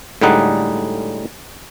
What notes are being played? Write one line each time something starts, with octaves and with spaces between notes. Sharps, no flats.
A2 D3 G3 G#3 D#4 F#5